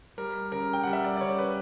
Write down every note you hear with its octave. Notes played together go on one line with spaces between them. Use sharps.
G3 A#4
C#3 A#4
G5
G3 F#5
E5
D5
D5
C#3 C#5
B4